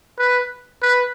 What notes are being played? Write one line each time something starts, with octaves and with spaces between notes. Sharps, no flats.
B4
B4